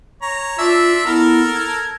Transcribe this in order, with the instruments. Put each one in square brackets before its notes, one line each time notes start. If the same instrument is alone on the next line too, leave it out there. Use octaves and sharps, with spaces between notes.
[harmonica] C#5 A#5
[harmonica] D4 E5 [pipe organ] F4 E6
[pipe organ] B3 E4 [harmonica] A4 A#4
[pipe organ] G#6